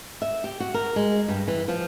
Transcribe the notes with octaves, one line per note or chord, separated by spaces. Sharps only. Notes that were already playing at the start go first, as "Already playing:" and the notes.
E5
G4
F#4
A#4
G#3
G2
E3
F3